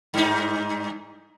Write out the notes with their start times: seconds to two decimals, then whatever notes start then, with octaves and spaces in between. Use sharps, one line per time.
0.14 G2 D#4